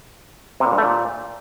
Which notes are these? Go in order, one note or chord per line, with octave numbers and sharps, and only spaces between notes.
C3
A#2
G2
A3
A#2